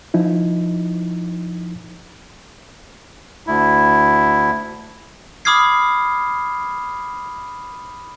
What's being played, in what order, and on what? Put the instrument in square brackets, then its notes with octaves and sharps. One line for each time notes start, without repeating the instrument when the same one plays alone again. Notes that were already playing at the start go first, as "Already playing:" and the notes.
[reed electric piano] F3 D#4 E4
[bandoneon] D2 E4
[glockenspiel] B5 D6 D#6 F6 G#6 C7